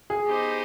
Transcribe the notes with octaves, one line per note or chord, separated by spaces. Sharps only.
G#4
B3 D#4 G4 C5 D#5